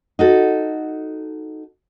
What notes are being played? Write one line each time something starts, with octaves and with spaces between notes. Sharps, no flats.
D#4 F#4 A4